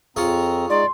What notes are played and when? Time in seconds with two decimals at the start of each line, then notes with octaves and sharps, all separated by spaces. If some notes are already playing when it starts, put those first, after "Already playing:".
0.16 F2 C4 F4 G#4 C#5 A#5
0.70 G#3 D#4 D5 C6